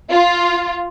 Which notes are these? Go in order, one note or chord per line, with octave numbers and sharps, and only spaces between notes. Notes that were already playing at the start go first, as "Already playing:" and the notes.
F4